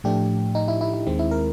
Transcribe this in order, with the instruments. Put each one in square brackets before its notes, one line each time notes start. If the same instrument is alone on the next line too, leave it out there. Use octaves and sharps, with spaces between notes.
[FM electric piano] A2 F3 A3 D4 G4
D#4
E4
E4
E4
D#2 D#3 G#3 C4
E4
A#4